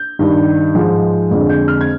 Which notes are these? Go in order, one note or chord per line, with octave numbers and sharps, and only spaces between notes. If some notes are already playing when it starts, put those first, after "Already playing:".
Already playing: G6
G2 D#3 G3
G#2 F3 G#3
F2 D3 G#3
G6
F6
G#6